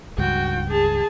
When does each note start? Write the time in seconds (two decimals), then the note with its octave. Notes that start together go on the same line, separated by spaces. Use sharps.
0.18 C#2 G2 F#4 G5
0.69 G#4 A5